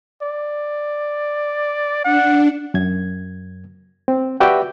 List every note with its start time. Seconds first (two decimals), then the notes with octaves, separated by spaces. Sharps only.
0.22 D5
2.04 D4 F#5
2.74 F#2 G#6
4.08 C4
4.40 F#4 G4 B4 D5 E5 G5